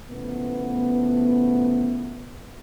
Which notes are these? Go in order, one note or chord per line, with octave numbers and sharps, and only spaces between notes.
A2 C#3 F3 A3 B3